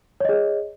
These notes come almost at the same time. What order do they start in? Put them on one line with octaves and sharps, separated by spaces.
C#5 D#5 G#4